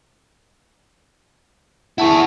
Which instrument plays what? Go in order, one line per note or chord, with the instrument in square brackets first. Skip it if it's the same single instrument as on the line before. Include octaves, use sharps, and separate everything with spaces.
[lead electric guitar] E4 G#4 [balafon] F#5 A5 C#6